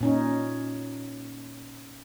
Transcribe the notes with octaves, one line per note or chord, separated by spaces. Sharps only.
A#2 C#4 D#4